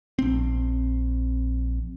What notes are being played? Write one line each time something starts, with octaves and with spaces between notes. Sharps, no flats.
A#1 C4